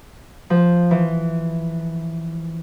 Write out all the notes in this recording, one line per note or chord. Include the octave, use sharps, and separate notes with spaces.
F3
E3